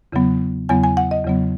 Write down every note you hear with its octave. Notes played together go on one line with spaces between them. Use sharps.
E2 C#3 F#3 B3
E2 C#3 F#3 B3 G#5
G#5
F#5
D#5
E2 C#3 F#3 B3